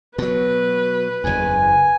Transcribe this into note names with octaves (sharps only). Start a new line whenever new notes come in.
B2 F#3 B4
F#1 E2 G#5